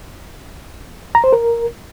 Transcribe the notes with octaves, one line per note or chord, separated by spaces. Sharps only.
A#5
C5
A#4